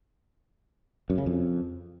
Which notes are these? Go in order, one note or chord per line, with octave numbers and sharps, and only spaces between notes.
F#2
C#3
F2